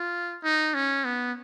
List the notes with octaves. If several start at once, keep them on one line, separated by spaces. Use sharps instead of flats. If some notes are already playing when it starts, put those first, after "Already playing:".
Already playing: F4
D#4
C#4
B3